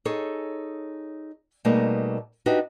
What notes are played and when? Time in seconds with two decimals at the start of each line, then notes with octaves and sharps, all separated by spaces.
0.05 D#4 G#4 A4 C#5
1.65 B2 G3 A3 A#3 D#4 G#4
2.46 D4 D#4 F#4 G4 B4 E5